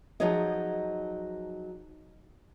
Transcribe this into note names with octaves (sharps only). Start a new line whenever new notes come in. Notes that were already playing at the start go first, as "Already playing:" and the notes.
F3 F#3 D#4 G#4 C#5 D#5